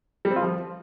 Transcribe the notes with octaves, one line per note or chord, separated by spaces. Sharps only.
G3
C4
F4
F3